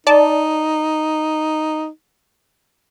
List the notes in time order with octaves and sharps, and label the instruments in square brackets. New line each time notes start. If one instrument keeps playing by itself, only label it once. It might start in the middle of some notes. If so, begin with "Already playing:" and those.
[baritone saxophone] D#4 [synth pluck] D5 A5